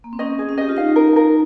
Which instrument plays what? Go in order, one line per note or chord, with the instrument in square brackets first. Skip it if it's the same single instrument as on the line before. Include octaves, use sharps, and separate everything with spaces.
[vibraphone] A#3
C4
[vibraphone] C#4 [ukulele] D#5
[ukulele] G#4
[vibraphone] C#4
[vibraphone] G4 [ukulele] D#5
[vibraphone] F4
[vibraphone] D#4 [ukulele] F5
[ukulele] A#4
A#4